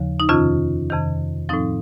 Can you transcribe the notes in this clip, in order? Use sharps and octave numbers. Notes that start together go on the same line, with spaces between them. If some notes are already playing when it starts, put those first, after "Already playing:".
Already playing: D#2 C#3 F3
D#4
F2 C3 D#3 C#4 F4
F2 C3 D#3
A2 F3 C4 D#4